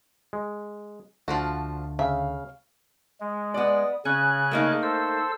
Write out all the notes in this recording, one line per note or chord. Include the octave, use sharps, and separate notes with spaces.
G#3
D2 D3 F3 A3 D4 F4 F#4
C#3 E5 F5
G#3
B3 D5
C#3 C#4 G#5 F#6
A3 A#3 D#4
A4 C5 E6